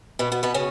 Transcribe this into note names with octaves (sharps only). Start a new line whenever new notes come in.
B2 B3
B2 B3
B2 B3
C#3 C#4